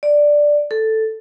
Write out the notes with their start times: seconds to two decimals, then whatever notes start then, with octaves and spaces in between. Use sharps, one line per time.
0.03 D5
0.71 A4